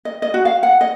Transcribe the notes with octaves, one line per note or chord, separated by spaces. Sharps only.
D#5
D#5
F#4
F5
F#5
D#5